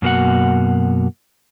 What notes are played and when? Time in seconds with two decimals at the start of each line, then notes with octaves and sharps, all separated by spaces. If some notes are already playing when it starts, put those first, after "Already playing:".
0.02 F#2 B2 A#3 F#4 F#5